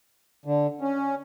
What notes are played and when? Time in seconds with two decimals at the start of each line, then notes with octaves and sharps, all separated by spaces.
0.45 D3
0.81 C#4